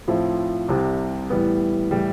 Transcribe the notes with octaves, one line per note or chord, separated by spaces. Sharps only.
A2 F3 C4 E4
C2 C3 G3
A2 E3 G3 B3
A2 E3 G3